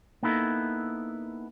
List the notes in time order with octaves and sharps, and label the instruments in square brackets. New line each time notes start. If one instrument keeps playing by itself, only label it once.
[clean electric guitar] A#3 B3 D#4 E4 A4